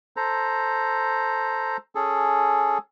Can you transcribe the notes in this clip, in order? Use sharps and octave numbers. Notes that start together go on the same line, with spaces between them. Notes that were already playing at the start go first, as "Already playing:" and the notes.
A4 C5 A#5
C#4 G#4 A4